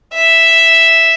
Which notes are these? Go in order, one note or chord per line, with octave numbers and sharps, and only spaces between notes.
E5